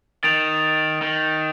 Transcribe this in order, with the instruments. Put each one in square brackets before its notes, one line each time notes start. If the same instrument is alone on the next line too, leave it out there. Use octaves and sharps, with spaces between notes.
[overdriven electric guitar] D#3 [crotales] A6 D7 F7
[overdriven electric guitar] D#3